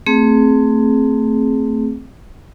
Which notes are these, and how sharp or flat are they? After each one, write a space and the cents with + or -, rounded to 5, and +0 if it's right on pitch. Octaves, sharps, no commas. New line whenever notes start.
A3 +25 C4 +5 G#4 +20